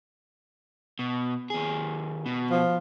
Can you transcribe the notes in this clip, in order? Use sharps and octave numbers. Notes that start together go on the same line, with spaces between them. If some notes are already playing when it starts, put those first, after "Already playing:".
B2
D#2 G#4
B2
F3